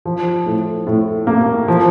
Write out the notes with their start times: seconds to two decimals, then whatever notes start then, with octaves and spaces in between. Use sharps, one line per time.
0.05 F3
0.46 A2
0.87 A2
1.27 A#3
1.68 F3